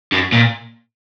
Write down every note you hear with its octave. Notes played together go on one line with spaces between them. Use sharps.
F#2
A#2